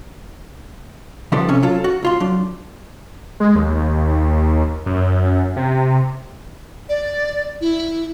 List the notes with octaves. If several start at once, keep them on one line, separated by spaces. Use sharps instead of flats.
C#3 F3 G3 B3 D4 A4
C3 C#4
F#3 F4 A4
F#4
C#2 F4 C6
F#3 D4
G#3
D#2
F#2
C3
D5
E4